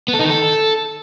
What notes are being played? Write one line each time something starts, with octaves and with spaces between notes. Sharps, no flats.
B3
A4
D#4
D#3
A4